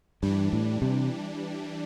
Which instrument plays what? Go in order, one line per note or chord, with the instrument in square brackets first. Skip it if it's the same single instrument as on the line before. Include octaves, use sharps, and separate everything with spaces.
[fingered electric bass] G2 [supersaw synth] E3 G3 D4
[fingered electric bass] A2
C3